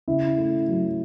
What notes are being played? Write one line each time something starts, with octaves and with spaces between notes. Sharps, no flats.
C#3 E4
A3
F#3